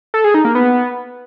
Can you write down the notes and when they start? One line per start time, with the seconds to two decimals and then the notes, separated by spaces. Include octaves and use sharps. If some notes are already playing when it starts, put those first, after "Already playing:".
0.14 A4
0.24 G#4
0.34 D#4
0.45 A#3
0.55 B3